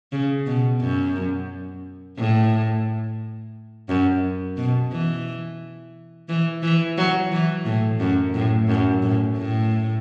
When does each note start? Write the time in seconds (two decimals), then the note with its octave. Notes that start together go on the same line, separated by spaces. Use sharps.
0.12 C#3
0.46 B2
0.81 F#2
2.18 A2
3.89 F#2
4.57 B2
4.91 E3
6.29 E3
6.63 E3
6.97 F#3
7.32 E3
7.66 A2
8.00 F#2
8.34 A2
8.68 F#2
9.02 A2
9.37 A2